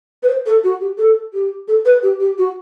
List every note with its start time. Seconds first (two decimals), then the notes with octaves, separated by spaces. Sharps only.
0.23 B4
0.28 C5
0.46 A4
0.64 F#4
0.81 G4
0.98 A4
1.33 G4
1.68 A4
1.85 B4
2.03 G4
2.20 G4
2.38 F#4